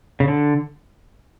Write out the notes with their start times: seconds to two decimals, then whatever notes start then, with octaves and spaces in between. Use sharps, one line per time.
0.20 C#3
0.28 D3